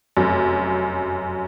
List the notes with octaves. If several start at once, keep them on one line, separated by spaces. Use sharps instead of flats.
F1 F#2